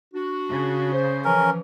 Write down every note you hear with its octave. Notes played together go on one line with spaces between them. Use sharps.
D4 F#4
C#3
C5
E3 F3 C#4 A#4